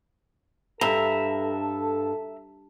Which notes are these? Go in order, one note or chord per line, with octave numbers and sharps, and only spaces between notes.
G2 A4 E5 A#5